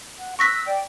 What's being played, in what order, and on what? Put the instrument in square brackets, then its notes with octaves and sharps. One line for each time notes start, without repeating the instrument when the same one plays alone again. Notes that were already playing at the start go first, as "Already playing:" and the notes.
[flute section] F#5
[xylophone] C#6 A#6 B6 [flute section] E6 F#6
[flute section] D5 G5